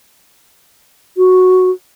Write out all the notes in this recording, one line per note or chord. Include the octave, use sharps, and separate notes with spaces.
F#4